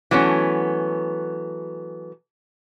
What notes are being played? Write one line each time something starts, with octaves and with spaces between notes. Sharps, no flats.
E3 F#3 A3 B3 C#4